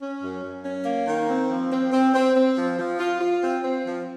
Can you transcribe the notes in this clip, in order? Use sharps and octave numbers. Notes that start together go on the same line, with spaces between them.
C#4
F#2
F#2
C#4
A#3
D#3
C4
F3
C4
C4
C4
C4
F3
F3
F4
F4
C4
C4
F3